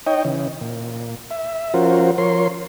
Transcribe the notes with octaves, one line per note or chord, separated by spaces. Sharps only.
D#4 C#5 D#5 G5
C#3 E3
A#2
E5
F3 C#4 F4 F#4 A#4 C5
F3 A#4 C#5 C6